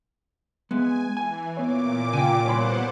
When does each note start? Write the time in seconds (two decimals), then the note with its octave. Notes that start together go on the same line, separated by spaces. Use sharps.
0.71 G#3 B3 G#5
1.17 E3 G#5
1.57 A#2 B3 C#5 D6
2.13 C#3 G5 G#5
2.46 C2 B3 C5 C#5 F#5 G#5 B5 C6